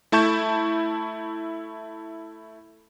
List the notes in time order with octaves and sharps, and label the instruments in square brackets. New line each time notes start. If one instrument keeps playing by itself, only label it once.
[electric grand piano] A3 E4 A5 C#6 G6 E7